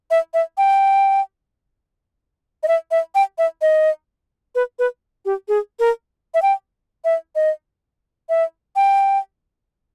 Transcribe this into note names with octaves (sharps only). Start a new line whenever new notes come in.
E5
E5
G5
D#5
E5
E5
G5
E5
D#5
B4
B4
G4
G#4
A#4
E5
G5
E5
D#5
E5
G5